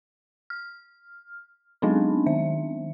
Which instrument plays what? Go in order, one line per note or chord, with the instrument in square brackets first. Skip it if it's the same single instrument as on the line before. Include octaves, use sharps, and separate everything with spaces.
[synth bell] F6
F#3 G#3 B3 C4 D4 D#4
D#3 E5